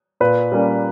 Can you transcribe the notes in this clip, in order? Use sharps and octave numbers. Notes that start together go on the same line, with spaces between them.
A#2 B4
G3 A#3 C#4